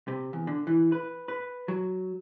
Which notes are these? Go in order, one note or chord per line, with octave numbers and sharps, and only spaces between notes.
C3
E2
D3
E3
B4
B4
F#3